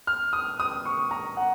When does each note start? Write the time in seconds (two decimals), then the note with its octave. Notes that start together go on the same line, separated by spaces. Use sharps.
0.07 F6
0.33 D#6
0.60 D#6
0.85 C#6
1.11 A#5
1.37 F#5